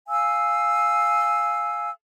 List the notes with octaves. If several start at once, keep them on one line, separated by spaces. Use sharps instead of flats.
F5 G#5 E6